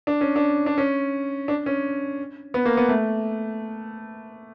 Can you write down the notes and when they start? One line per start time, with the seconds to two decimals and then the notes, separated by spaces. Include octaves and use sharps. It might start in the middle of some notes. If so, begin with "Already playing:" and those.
0.07 D4
0.21 C#4
0.36 D4
0.66 D4
0.78 C#4
1.48 D4
1.66 C#4
2.54 B3
2.65 A#3
2.77 B3
2.89 A3